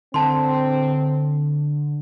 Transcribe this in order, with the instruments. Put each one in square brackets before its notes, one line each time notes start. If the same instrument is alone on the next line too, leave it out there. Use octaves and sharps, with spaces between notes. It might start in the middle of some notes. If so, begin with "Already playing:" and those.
[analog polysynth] D3 [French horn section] C4 [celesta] A5 C6